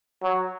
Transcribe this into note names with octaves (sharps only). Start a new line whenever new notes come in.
F#3